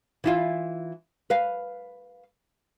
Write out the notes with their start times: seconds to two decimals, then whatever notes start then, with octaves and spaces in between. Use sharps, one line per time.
0.24 E3 E4 F4
1.30 B4 F5